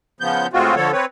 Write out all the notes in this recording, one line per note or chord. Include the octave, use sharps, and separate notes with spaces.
C#3 F3 B3 G6
A2 G#3 C4 F4 F#4
D3 F3 A4 C#5
C4 B4 C#5